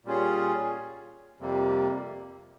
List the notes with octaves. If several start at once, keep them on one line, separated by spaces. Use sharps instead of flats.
A#2 G3 C#4 F4 G#4
F2 C3 G3 A#3